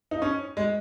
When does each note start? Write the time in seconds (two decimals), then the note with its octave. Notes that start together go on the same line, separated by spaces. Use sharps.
0.11 D#4
0.22 C#4
0.57 G#3